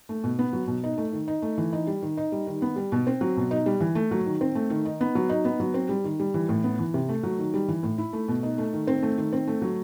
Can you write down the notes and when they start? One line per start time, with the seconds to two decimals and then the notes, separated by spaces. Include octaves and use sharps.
0.09 A3
0.24 B2
0.39 B3
0.53 F#3
0.68 B2
0.84 D#4
0.98 A3
1.13 D#3
1.28 D#4
1.42 A3
1.58 E3
1.73 D#4
1.87 G3
2.02 D#3
2.17 D#4
2.32 G3
2.47 D#3
2.62 B3
2.76 G3
2.92 B2
3.07 C4
3.21 F#3
3.37 B2
3.51 D#4
3.66 G3
3.80 E3
3.95 A3
4.11 F#3
4.26 D#3
4.41 C4
4.55 A3
4.70 D#3
4.85 D#4
5.01 B3
5.15 F#3
5.29 D#4
5.45 B3
5.60 F#3
5.74 C4
5.89 G3
6.04 D#3
6.20 G3
6.34 E3
6.49 A2
6.64 B3
6.79 E3
6.94 C3
7.09 A3
7.23 F#3
7.39 D#3
7.54 G3
7.68 E3
7.83 A2
7.98 E4
8.13 A3
8.28 B2
8.43 D#4
8.58 A3
8.73 D#3
8.87 C4
9.03 A3
9.18 D#3
9.33 C4
9.47 A3
9.62 F#3